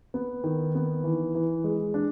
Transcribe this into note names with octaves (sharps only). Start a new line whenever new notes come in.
B3
D#3
B3
E3
E3
G#3
D4